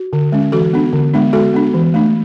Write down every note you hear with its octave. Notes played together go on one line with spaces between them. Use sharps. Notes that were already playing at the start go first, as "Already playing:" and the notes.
Already playing: F#4
D3
G#3 C#4
E3 F#4 A4
B3 D4
D3
G#3 B3 D4
G#3 F#4 A4
B3 D4
E3
A3 D4